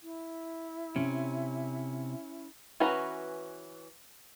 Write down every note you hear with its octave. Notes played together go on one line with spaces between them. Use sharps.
E4
C3 C#4
E3 C#4 F#4 B4 A#5